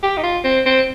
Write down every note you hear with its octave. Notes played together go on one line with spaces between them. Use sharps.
G4
D#4
F4
C4
C4